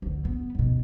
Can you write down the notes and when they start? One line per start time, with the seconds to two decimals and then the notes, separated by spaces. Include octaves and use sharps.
0.02 D2 D3
0.25 B3
0.55 D#2 B2